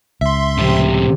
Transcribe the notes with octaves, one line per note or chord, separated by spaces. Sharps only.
C#2 E5 C6
F2 A2 C3